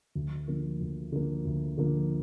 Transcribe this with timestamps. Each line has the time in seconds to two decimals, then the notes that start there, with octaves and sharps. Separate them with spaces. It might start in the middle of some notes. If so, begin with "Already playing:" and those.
0.15 D2
0.48 D3 F3 A#3
0.81 D2
1.12 D3 F3 A#3
1.45 D2
1.78 D3 F3 A#3